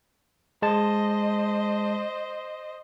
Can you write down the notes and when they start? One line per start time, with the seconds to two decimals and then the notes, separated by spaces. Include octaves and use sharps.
0.62 G#3 C5 D#5 A5